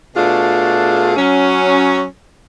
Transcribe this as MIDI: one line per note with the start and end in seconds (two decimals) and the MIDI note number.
0.15 1.13 47
0.15 1.13 57
0.15 1.13 62
0.15 1.13 65
0.15 1.13 68
1.17 2.04 54
1.17 2.04 61